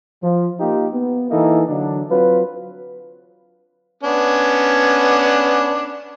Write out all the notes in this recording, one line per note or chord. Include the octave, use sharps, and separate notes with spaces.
F3
A#3 D#4 F4 G4
B3
E3 A#3 D#4 E4 A4
D3 F#3 D4
F#3 C4 F4 B4
B3 C#4 D4